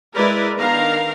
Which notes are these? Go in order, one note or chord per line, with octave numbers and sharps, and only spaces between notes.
G#3 E4 A#4 B4 D5
D#3 B3 D4 A#4 F5 A#5